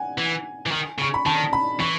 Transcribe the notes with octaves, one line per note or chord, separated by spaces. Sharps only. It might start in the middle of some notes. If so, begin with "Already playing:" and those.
Already playing: F#5 G#5
E3
E3
D#3
C#3 C#6
B5
D#3 A5
B5
E3 C#6